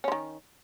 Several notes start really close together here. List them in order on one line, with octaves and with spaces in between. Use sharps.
C#4 D3 D#3